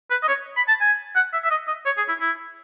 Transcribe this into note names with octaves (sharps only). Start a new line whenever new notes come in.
B4
D#5
C#5
B5
A5
G#5
F#5
E5
E5
D#5
D#5
C#5
G#4
E4
E4